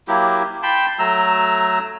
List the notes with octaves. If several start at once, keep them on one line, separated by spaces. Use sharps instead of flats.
F#3 A#3 E4 G4
G5 A5 B5 C6
F#3 A3 A#5 E6